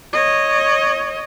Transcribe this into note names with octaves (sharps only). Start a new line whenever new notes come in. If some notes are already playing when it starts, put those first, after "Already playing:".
C#5 D#5